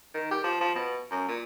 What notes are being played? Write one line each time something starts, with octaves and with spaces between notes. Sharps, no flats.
D#3
G4
F3
F3
B2
F#2
A#2